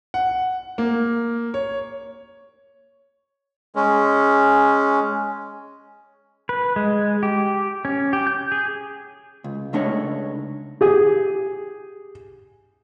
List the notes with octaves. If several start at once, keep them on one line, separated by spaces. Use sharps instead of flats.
F#5
A#3
C#5
G#3 C#4
B4
G#3
G4
C#4
G4
G6
G#4
C#2
C#2 A3 D4 D#4 C#5
G4 G#4